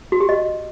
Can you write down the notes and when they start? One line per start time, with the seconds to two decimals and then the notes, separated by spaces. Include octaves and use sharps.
0.12 F#4
0.20 G4
0.29 D#5